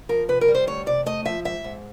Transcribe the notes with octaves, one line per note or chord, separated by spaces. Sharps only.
F3 A#4
C3 B4
A#4
G3
C5
D2 C#5
C3 D5
A3 D#5
F3 E5
G#2 E5
G#2